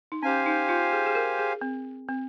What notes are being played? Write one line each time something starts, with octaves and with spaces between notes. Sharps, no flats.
D#4
C#4 G4 C5 F5 G#5
D#4
F4
G#4
G#4
A#4
G#4
C4
C4